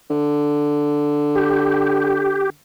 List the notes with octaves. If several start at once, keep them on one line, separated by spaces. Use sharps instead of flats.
D3
G4